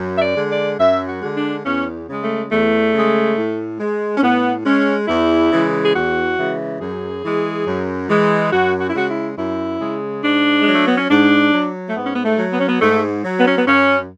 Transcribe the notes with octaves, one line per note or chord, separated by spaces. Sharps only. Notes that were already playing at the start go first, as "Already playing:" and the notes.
Already playing: F#2
E5
D5
D3 G#3
D5
F#2 E5
F#4
D3 G#3
D4
E2 C#4
C#3 G#3
A3
E2 A3
C#3 G#3
A2
G#3
C#4
A2 B3
G#3 C#4
E2 E4
C#3 E3 G#3
G#4
E2 F#4
C#3 E3 G#3
F#2 G#4
E3 G#3
F#2
E3 G#3
F#2 F#4
F#4
E4
C#3 G#3 F#4
E4
F#2 E4
C#3 G#3
G#2 D4
G#3
F#3
A3
B3
C#4
G#2 D4
F#3
A3
G#2 B3
C#4
B3
A3
F#3
B3
C#4
B3
G#2 A3
F#3
B3
C#4
B3
F#2 C#4